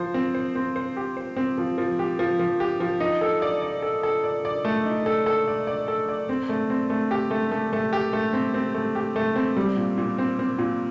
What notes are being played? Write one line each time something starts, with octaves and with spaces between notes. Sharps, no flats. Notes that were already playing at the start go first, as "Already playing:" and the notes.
Already playing: F3 C5
C4
C5
C4
C5
G4
C5
C4
F3
F3
G4
F3
F3
G4
F3
D#4
A4
D5
D5
A4
A4
D5
D5
A3
D#4
A4
A4
D5
D5
A4
D5
C4
A3
C4
A3
G4
A3
A3
A3
G4
A3
C4
C4
A3
G4
A3
C4
G3
A#2
A#2
C4
C4
A#2